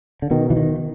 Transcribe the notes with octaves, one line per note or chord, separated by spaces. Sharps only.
D3
B2 D#3
E3
D#3